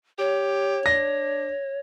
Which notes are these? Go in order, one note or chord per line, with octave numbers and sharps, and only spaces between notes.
G4 C#5
D4 A#6